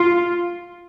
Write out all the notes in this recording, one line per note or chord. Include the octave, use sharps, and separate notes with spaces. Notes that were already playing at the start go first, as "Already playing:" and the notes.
Already playing: F4